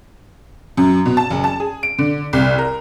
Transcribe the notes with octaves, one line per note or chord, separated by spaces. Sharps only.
F#2
B2
A5
F#1
A5
G#4
D7
D3
C2
A#4